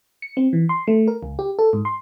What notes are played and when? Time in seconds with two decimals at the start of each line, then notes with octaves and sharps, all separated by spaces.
0.22 C#7
0.37 C4
0.53 E3
0.69 C6
0.88 A3
1.07 A#4
1.23 C#2
1.39 G4
1.59 A4
1.73 G#2
1.85 C6